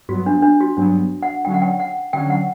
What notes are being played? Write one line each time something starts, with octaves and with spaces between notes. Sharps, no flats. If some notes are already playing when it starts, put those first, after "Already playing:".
G2 F#3 B3 F#4
D4
D4
F#4
G2 F#3 B3 D4
F#5
D3 F#3 C#4 G5
F#5
G5
F#5
D3 F#3 C#4 G5
F#5